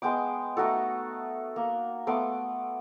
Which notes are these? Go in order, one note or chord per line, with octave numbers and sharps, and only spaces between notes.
G#3 B3 G5 D6
A3 D#4 F#4 A4
A#3
A3 B3 C6 D6